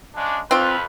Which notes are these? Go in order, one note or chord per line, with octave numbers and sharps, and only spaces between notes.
C#3 G#3 D4
F2 C4 F4 B4